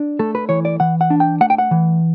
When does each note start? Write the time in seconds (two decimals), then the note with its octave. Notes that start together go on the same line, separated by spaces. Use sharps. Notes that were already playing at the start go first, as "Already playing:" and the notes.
Already playing: D4
0.19 A3 A4
0.35 B4
0.49 E3 C#5
0.65 D5
0.80 E3 F#5
1.01 F#5
1.10 D4
1.20 G5
1.41 A3 F#5
1.50 G5
1.58 F#5
1.71 E3